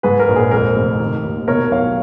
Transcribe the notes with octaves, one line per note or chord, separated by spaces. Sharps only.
G#2 G#4 B4
A#4
A#1
G#4
F2 A#4
F1
D#3
D#2
B2 A#4 C#5
B1 C#5 F5